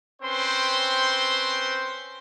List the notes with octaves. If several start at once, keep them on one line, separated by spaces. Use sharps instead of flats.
C4 C#4 B4 C5 G5 C6